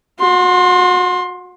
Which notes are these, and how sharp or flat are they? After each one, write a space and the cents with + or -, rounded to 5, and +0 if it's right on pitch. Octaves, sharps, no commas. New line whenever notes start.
F#4 -30 C6 +15